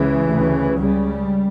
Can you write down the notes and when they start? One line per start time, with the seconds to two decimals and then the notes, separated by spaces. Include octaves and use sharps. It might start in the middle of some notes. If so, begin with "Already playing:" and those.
Already playing: C#2 C#3 E3
0.28 D2
0.34 C#3
0.77 C#2 C#3 G3